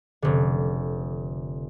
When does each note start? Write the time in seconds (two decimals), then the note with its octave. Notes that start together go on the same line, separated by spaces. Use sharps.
0.22 F1 D3